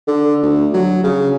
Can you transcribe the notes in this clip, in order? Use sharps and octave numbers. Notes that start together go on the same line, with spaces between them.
D3
D2
F#3
C#3